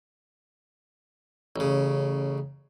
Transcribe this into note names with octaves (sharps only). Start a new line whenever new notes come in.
A1 C#3